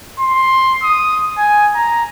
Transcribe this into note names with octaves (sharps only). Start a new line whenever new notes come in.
C6
D#6
G#5
A#5